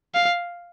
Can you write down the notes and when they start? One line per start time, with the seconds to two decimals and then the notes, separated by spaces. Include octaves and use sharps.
0.14 F5